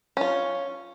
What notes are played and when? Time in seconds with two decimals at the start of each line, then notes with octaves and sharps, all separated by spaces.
0.17 C#4 F4